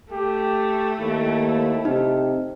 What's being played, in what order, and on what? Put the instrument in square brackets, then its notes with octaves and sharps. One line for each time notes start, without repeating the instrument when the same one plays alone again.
[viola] A3 [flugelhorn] G4
[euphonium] D#2 [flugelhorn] E4
[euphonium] C3 [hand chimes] D#4